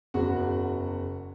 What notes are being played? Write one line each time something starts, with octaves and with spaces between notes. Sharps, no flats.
F#1 E2 C#3 F#4 F#5